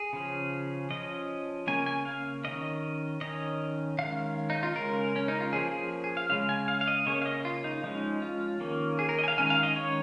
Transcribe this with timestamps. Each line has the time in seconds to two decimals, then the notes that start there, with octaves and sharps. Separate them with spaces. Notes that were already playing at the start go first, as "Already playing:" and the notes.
Already playing: G#4
0.13 C#3 F3 C#4
0.91 F3 C#4 D#5
1.67 C#3 A#3 C#4 G#5
1.86 G#5
2.05 F5
2.44 D#3 C#4 D#5
3.21 D#3 C#4 D#5
3.98 D#3 G#3 C#4 F5
4.50 D#4
4.63 F4
4.75 C#3 G#3 C#4 A#4
5.16 C#4
5.28 D#4
5.40 F4
5.52 F3 A#3 C#4 G#4
5.71 G#4
6.04 G#4
6.17 F5
6.29 C#3 F3 G#3 C#4 F5
6.49 G#5
6.68 F5
6.81 F5
6.87 D#5
7.06 C#3 A#3 C#4 C#5
7.22 F5
7.26 D#5
7.45 F4
7.64 D#4
7.83 F3 G#3 C#4 D#4
8.22 F4
8.60 D#3 A#3 C#4
8.99 G#4
9.09 A#4
9.19 D#5
9.24 G#5
9.28 F5
9.37 D#3 G#3 C#4 G#5
9.50 F5
9.63 D#5
9.76 C#5